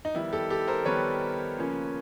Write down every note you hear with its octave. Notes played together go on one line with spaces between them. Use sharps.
D#4
D#3 G3 B3 E4
G4 A4
G4 A4
A#4 C5
D#3 G3 B3 B4 C#5
C#3 F3 A#3 C#4